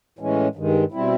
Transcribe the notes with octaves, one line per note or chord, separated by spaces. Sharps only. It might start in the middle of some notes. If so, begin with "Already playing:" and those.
A2 E3 G#3 C#4
G2 D#3 G#3
B2 G3 C4 E4